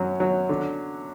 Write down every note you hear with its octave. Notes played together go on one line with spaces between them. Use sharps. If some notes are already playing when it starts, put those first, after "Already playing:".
Already playing: F#2 F#3
F#3
D3